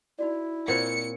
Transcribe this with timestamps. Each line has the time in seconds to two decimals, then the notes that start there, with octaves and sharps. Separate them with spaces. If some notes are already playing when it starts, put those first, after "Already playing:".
0.19 D#4 E4 F#4 D5
0.68 A#2 C4 C#5 F#5 C#7